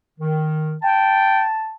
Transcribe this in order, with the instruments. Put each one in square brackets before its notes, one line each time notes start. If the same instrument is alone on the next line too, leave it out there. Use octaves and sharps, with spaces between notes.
[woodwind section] D#3
[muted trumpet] G5 [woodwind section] A5